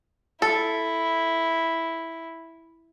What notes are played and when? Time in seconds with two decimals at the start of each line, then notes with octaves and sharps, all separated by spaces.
0.42 E4 A4